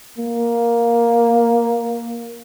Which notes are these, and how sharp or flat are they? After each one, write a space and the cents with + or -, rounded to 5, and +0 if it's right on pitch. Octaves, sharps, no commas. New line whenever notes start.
A#3 +5